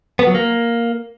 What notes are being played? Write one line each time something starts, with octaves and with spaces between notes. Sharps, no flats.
B3
F#3
A#3